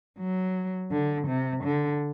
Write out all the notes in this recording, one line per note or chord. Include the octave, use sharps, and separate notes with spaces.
F#3
D3
C3
D3